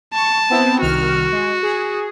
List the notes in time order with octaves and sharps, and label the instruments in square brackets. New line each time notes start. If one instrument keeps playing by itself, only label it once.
[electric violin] A5 [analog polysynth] C#6
[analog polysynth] B3 C4 E4
[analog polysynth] C2 D#3 F6 [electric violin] F#4
[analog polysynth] G#3
G#4